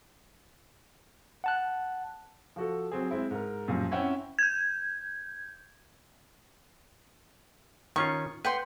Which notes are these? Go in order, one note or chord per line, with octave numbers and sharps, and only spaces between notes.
F#5 A5 F#6
F3 F#4 A4
F#3 C4 G#4
G#3 C4 E4
G#2 A#4
F#2 A#2 F3 G3
C4 C#4 E4 E5 F#5 G5
G6 G#6
D#3 C#4 F4 C#6
B4 F#5 G5 C6